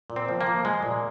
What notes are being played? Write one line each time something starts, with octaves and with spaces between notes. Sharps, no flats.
A#2
C4
F3
A#3
F3
F3 G#3
A#2